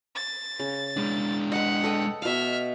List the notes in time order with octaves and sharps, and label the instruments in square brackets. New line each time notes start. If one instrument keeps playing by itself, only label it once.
[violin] A6
[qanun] C#3
[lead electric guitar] G#3 D4
[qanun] B4 D#5 [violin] F#5
[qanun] A4 D#5 G5
[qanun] B2 F5 [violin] E5 F6